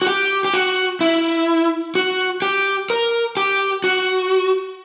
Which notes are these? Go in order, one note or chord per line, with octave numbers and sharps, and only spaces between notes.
F#4
G4
G4
F#4
E4
F#4
G4
A#4
G4
F#4